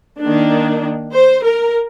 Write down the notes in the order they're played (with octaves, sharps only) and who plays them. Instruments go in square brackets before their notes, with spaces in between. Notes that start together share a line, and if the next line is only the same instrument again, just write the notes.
[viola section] D#3 A#3 D4
C5
A#4